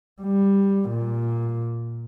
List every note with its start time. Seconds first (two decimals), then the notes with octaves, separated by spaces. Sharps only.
0.22 G3
0.90 A#2